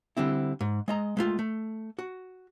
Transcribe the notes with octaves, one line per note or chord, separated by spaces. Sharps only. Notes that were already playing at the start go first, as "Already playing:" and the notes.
D3 G3 C4 E4
G#2
G#3 D#5 A#5
G#3 A3 F4
A3
F#4